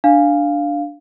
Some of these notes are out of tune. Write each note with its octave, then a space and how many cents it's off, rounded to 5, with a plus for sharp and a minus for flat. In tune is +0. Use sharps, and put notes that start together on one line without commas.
D4 +0 F5 +0